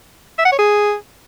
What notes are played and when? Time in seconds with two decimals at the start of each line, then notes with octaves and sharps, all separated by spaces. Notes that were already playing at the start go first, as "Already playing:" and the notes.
0.39 E5
0.45 F#5
0.52 C#5
0.59 G#4